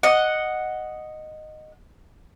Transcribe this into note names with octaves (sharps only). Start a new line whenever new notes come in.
D#5 F#5